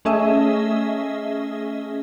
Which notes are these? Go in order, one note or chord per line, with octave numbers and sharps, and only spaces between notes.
A3 C#4 G#4 D#5 E5